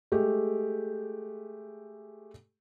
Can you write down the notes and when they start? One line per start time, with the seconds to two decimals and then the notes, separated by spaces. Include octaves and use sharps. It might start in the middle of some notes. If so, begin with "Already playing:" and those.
0.12 G#3 A3 G4